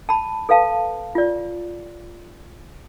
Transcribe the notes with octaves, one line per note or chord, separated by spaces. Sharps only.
A5 B5
A4 B4 F5 A5
F4 D5